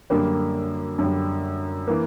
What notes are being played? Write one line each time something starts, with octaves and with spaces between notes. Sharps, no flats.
F#2 D3 G3 A#3
F#2 D3 G3
E3 A#3